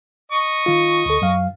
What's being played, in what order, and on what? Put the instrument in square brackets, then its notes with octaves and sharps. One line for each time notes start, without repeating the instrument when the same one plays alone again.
[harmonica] D#5 C#6
[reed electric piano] D#3 F4
D2 A4
F#2 F#3 F5